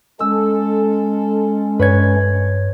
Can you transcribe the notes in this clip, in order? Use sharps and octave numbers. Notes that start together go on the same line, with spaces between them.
G#3 C#4 A4 E6
G2 B4 C#5 G#6